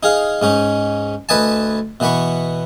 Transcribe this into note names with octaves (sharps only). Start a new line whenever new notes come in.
D#4 G#4 F5
G#2 C#4 D#4
D2 B4 D#5 G#5 A5
B2 E3 B3 B5 C#6